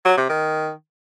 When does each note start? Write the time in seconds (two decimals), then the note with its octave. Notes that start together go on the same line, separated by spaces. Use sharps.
0.05 F#3
0.17 C3
0.29 D#3